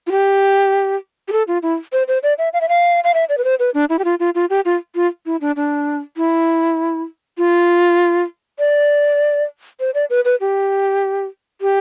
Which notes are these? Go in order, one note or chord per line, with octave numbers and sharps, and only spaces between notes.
F4
G4
G4
A4
F4
E4
C5
C5
D5
E5
F5
E5
F5
F5
E5
D5
B4
C5
B4
D4
E4
G4
F4
F4
F4
G4
F4
F4
E4
D4
D4
E4
F4
D5
C5
D5
B4
B4
G4
G4